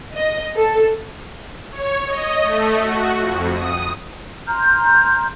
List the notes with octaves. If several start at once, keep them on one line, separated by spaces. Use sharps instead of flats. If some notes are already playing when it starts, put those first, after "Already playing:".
D#5
A4
C#5
D#5
A3
F#4
F2
D#6
A#5 C6 F6 G6